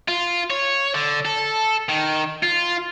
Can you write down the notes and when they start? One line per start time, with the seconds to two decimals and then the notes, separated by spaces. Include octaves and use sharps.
0.08 F4
0.50 C#5
0.94 D3
1.25 A4
1.89 D#3
2.43 F4